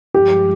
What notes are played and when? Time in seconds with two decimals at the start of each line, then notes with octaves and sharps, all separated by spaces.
0.14 G2 F3 G#3 G4